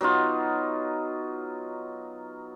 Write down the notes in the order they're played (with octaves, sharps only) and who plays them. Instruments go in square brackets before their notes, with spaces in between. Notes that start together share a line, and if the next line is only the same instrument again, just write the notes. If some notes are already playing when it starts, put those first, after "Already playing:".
[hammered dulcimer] F#3 B3 D#4 F4